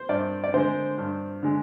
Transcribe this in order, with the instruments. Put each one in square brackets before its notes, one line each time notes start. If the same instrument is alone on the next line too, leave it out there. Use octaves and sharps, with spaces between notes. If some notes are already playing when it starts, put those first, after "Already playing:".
Already playing: [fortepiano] C5
[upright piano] G2 [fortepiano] D5
[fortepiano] D5
[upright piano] D3 G#3 [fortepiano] C5
[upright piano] G2
D3 G#3